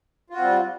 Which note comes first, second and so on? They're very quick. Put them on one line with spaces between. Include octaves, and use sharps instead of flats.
F4 F#4 C4 G3